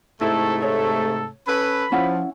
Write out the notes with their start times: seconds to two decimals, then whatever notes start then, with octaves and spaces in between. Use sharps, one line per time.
0.21 G#2 C3 A3 E4 A4
0.62 A4 C#5
1.48 C#4 A4 B4 B5
1.92 F3 C#4 E4 F#5